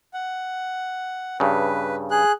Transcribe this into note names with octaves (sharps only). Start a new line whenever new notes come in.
F#5
G2 C#3 B4
G#4 F#6